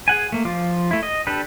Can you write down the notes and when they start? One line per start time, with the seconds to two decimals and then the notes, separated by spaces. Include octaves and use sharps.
0.08 G#4 F#5 G#5
0.32 A3 A#3
0.45 F3 F4 F5 D6
0.91 A3 E4
1.03 D#5
1.27 D4 G4 A4 B4